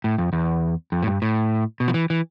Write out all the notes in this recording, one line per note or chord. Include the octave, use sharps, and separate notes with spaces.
A2
F2
E2
F2
A2
G2
A2
B2
F3
E3
E3